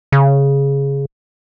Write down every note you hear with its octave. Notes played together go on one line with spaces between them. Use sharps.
C#3